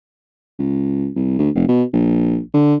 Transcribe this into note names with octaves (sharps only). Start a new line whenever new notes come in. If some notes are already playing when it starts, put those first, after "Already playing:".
C#2
C2
D2
F1
B2
A#1
D3